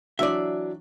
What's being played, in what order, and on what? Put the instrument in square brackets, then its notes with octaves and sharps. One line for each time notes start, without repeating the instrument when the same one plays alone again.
[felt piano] E3 F#3 D4 [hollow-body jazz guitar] D5 E5